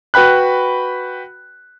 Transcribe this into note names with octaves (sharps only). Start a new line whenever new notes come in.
F#4 B4 G5 B5 F#6